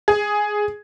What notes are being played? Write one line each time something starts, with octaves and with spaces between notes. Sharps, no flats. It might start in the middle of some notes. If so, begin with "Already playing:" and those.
G#4